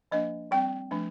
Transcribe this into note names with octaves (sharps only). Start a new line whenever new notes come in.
F3 A#3 D4 D#5
G3 C4 G5
F3 A3 D4